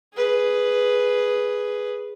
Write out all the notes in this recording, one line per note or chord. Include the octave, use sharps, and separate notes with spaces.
G#4 B4